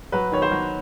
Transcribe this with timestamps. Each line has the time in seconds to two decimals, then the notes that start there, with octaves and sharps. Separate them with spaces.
0.12 F#3 B4
0.32 D#3 C#5
0.42 C5
0.51 F#3